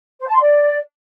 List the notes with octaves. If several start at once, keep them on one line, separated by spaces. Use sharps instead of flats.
C5
A5
C6
D5